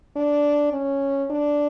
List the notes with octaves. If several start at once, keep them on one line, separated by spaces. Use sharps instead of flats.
D4
C#4
D4